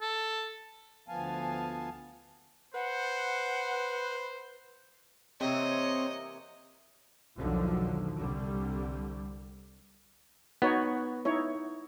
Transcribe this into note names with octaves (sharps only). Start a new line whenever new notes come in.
A4
D2 F3 B3 F5 G#5 A5
B4 C5 F#5
C3 E3 A#3 C4 C#5 D#5
B1 E2 D3 D#3 F3 F#3
C2 D3 G3
B3 D#4 F#4 C#5
D#4 E4 C#5